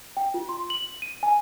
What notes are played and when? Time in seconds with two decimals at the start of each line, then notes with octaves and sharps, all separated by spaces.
0.17 G5
0.34 F4
0.49 C6
0.70 F#7
1.02 D#7
1.23 G#5